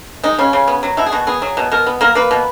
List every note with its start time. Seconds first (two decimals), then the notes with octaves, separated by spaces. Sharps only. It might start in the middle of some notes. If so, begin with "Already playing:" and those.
0.23 G#3 D#4
0.38 C#3 C#4
0.53 C#3
0.68 B3
0.83 F#3
0.97 B2 E4
1.06 G#4
1.12 B2 F#4
1.27 B3 G#4
1.42 F#3
1.57 B2
1.72 B2 A#4
1.87 B3
2.01 A#3 A#4
2.15 A#3 B4
2.31 B2